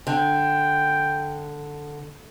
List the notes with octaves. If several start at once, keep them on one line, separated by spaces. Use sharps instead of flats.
D3 G5